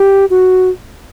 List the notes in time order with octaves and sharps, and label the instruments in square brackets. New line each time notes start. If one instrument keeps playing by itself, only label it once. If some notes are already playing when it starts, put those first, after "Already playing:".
Already playing: [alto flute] G4
F#4